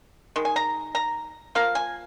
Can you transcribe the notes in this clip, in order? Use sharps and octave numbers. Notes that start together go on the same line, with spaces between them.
D#3 G#3
G#5
A#5
A#5
F3 A#3 F5
G#5